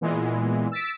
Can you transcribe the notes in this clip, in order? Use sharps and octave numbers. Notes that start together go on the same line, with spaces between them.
A#2 E3 G#3 B3
E6 A6 B6 D7